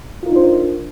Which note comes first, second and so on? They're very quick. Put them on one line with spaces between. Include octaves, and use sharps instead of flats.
F4 A#4 D#4 D4 C5